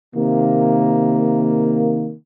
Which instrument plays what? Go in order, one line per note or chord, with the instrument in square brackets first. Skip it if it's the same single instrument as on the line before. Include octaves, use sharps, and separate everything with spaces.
[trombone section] C3 D#3 A#3